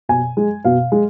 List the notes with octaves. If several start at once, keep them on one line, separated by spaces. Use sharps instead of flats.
B2 G#5
G#3
B2 F5
G#3